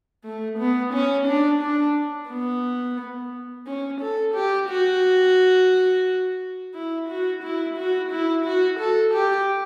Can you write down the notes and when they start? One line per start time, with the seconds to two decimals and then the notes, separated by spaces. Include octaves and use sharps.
0.24 A3
0.58 B3
0.93 C#4
1.27 D4
1.61 D4
2.30 B3
3.66 C#4
4.00 A4
4.34 G4
4.69 F#4
6.74 E4
7.09 F#4
7.43 E4
7.77 F#4
8.11 E4
8.45 F#4
8.79 A4
9.14 G4